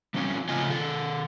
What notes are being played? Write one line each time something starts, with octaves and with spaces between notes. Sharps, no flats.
F3 G3 C4 C#4
C#3 F3 A3 F4 D#5 G#5
D#3 A4